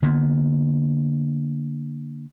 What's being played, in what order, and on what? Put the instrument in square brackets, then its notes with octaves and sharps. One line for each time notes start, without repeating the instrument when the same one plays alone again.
[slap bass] D3 A#3 B3